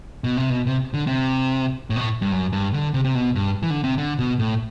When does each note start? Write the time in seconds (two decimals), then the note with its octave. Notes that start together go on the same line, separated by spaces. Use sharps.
0.24 B2
0.37 C3
0.50 B2
0.67 C3
0.94 D3
1.07 C3
1.90 A2
1.96 B2
2.01 A2
2.22 G2
2.32 F#2
2.53 G2
2.73 D3
2.94 C3
3.04 C3
3.15 B2
3.35 G2
3.63 E3
3.70 D3
3.84 C3
3.98 D3
4.19 B2
4.39 A2